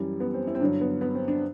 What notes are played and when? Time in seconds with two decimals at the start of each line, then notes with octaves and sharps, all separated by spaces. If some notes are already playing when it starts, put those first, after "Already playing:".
Already playing: F#2 E3 G3
0.20 B3
0.34 C4
0.47 E4
0.55 C4
0.61 G2 D3 F#3 D4
0.81 B3
1.01 B3
1.15 C4
1.28 D4